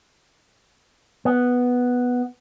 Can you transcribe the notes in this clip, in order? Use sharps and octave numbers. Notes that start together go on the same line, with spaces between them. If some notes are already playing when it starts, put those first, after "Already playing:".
B3